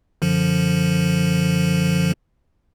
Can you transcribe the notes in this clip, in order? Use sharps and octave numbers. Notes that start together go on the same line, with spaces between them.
F#2 D3 F3